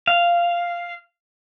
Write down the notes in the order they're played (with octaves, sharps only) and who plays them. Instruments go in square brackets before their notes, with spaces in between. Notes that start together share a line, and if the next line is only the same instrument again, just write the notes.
[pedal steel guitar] F5